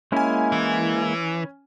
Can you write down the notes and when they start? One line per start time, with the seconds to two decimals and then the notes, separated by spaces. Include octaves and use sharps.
0.12 G#3 A#3 C#4 E4 G#5
0.52 E3